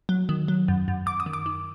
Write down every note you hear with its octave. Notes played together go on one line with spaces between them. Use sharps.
F#3
D#3
F#3
F#2
F#2
F#2 D6
D#6
D#3
D6
D#3